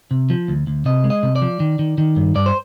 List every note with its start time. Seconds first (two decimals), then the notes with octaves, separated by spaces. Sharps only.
0.11 C3
0.30 F3
0.48 D2
0.67 D2
0.86 C3 D#5
1.04 G#3
1.10 D#5
1.23 C3
1.36 D5
1.42 F3
1.60 D#3
1.79 D#3
1.98 D#3
2.16 G2
2.35 G2 D5
2.46 C5